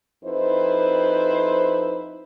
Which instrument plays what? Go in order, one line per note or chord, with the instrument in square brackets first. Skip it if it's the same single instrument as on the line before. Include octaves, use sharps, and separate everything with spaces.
[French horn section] F2 D#4 E4 B4 C5